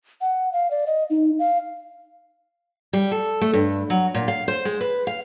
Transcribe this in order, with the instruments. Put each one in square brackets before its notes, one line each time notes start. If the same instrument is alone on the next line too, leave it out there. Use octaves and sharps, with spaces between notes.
[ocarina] F#5
F5
D5
D#5
D#4
F5
[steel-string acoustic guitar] G3
A4
A3
G2
F#3
A#2
F5
C5
G#3
B4
F5